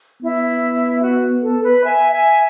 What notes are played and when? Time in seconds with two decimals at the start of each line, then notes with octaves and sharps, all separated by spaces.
0.22 B3 E4
1.03 F#4
1.43 A4
1.64 B4
1.85 E5 G#5
2.12 E5 G#5